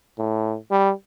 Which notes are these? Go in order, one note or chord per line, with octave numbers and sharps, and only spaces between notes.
A2
G3